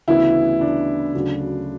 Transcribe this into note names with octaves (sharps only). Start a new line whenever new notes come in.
D2 C#3 E3 B3 E4
D4
D2 C#3 F#3